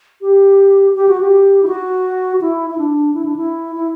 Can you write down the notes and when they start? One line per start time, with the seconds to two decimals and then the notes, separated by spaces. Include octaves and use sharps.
0.21 G4
0.95 G4
1.08 F#4
1.21 G4
1.63 E4
1.67 F#4
2.41 E4
2.70 E4
2.78 D4
3.14 E4
3.26 D4
3.36 E4
3.76 E4